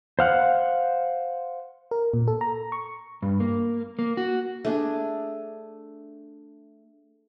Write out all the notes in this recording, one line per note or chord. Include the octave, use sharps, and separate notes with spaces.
C5 F5 F#5
A#4
A#2
A4
A#5
C#6
G2
A#3
A#3
F#4
A3 D4 G#4